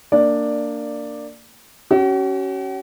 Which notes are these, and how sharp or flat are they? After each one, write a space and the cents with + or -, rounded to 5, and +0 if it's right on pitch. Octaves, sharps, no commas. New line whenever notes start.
A#3 -20 D4 +0 D5 +5
C#4 +0 F#4 +45